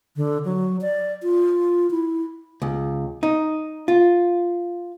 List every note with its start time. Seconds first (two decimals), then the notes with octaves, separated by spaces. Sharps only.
0.16 D3
0.45 F#3
0.81 D5
1.23 F4
1.91 E4
2.62 C#2
3.23 D#4
3.88 F4